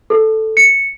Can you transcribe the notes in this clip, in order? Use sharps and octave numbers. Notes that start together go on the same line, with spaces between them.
A4
C#7